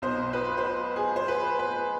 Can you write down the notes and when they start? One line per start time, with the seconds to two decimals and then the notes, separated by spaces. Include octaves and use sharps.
0.02 B1 B2 C5
0.33 B4
0.57 C5
0.64 B4
0.96 G#4
1.16 C5
1.28 B4
1.59 B4